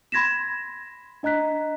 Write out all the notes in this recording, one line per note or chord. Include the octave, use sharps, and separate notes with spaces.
B5 C6 G#6 A#6 B6 E7
D4 D#5 A#5 F#6 B6